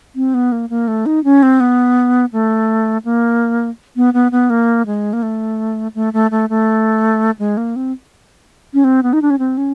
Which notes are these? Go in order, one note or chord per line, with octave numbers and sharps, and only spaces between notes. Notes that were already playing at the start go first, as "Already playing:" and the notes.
C4
B3
A#3
A#3
A3
D#4
C#4
C4
B3
A3
A#3
B3
B3
B3
A#3
G#3
A#3
A3
A3
A3
A3
A3
G#3
A#3
C4
C#4
C4
B3
D#4
D4
C#4
C4
C#4